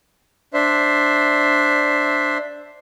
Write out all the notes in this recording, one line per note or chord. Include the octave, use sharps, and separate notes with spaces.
D4 C5 E5